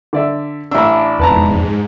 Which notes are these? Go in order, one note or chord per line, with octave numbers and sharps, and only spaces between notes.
D3 D5 E5
A1 D4 E4 E6
E1 F2 G#2 B2 B4 A5 A#5